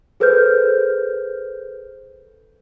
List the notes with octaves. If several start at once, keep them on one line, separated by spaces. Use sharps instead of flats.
G#4 A4 B4 C5 F6 G6